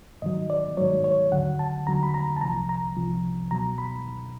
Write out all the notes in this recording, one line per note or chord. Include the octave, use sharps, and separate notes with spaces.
G#2 D#3 F#3 D#5
D5
G#2 D#3 F#3 C#5
C#5
D#2 D3 F#3 F#5
A5
D#2 D3 F#3 A#5
B5
A#5
A5
C2 C3 F3 A#5
A#5
C2 C3 F3
C#2 B2 F#3 A#5
B5